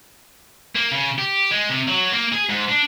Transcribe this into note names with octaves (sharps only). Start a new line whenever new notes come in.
A#3
C#3
G4
G#3
C3
F#3
A#3
G#4
G#2
D4